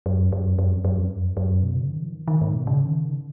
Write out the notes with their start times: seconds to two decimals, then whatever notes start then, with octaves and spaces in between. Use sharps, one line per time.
0.06 F#2
0.32 F#2
0.59 F#2
0.71 F2
0.85 F#2
0.97 F2
1.11 F#2
1.37 F#2
1.63 B2
1.75 C#3
1.89 D#3
2.02 F3
2.15 D#3
2.28 D#3
2.41 G#2
2.54 B2
2.67 C#3
2.84 D#3
3.03 C#3